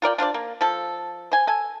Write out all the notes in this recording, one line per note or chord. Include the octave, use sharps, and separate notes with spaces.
F4 A#4 D5 G5
D4 F4 C5 D5
A#3
F3 A4
C5 G#5
A4 G#5